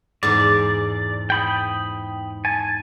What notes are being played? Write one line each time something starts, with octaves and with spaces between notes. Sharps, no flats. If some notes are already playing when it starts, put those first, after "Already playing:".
E2 G#2 D5
G5 B5 D#6
G#5 A5